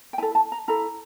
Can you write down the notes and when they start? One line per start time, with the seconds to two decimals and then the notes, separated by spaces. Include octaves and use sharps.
0.13 G5
0.18 E4 A4 G#5
0.35 A5
0.52 A#5
0.68 E4 A4 A#5